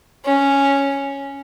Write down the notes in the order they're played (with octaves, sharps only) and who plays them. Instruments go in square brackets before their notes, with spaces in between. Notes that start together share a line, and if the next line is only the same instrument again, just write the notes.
[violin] C#4